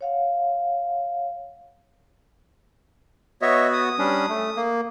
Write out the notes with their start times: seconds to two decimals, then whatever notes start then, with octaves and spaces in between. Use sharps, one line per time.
0.01 C#5 F5 F#5
3.42 B3 F#4 C#5 D#5 E5
3.73 D#6
3.99 G3 C#4 D4
4.29 A3
4.57 A#3